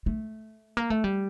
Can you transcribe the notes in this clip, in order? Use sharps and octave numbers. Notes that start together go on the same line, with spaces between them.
A3
A#3
A3
G3